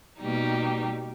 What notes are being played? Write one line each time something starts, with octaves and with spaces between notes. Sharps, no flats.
B2 G3 A#3 D#4 G4